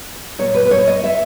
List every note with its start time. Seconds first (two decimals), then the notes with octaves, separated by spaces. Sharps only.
0.39 A#2 C#5
0.54 B4
0.65 B4
0.71 C#5
0.87 D#5
1.03 E5